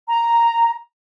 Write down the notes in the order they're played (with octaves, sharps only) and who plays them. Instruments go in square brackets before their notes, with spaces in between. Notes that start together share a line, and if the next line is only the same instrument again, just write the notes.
[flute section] A#5